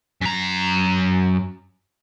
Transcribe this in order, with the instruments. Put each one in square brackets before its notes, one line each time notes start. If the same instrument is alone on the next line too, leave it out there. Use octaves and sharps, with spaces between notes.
[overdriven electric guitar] F#2 A#5